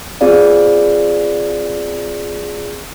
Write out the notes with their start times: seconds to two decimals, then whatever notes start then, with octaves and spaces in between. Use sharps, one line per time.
0.21 C4 F4 G#4 D5 F5